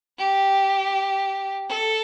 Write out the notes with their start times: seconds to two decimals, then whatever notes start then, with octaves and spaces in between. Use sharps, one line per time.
0.18 G4
1.69 A4